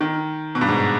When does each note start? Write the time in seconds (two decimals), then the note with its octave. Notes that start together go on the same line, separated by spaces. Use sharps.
0.01 D#3
0.55 B2
0.61 G2
0.68 G#2